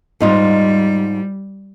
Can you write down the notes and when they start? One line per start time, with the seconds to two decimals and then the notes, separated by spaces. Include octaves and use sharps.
0.20 G#2 G3 D#4 F4